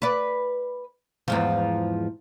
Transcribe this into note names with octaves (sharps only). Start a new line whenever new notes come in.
B4 D5
E2 G#2 F3